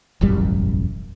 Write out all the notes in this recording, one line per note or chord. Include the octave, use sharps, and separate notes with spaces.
E1 A1 F#2 G3